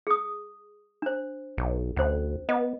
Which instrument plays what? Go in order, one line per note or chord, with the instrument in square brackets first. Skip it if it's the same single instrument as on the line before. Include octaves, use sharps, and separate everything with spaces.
[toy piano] G#4 D#6
D4 C5
[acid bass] B1
[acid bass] D2 [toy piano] C#4 C5
[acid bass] B3 [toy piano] D#5